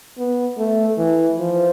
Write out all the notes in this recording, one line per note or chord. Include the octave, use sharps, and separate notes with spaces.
B3
A3
E3
F3